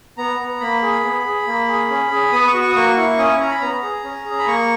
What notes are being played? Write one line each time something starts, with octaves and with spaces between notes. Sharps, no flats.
B3 A#5
B3
A#3 B5
G#4
B3
G#4
A#3
G#4
C#4
G#4
B3 D#6
C#6
F#4
C#6
D#6
A#3 C#6
E4
C#4 D#6
C#6
C#4 A#5
B5
B3 A#5
G#4
C#4
G#4
B5
A#3 C#6